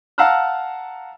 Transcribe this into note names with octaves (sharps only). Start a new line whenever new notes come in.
F5 F#5 A5 A#5 E6 F6